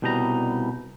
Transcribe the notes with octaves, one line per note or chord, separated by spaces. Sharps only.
C2 B2 G3 D#4 F4 A#5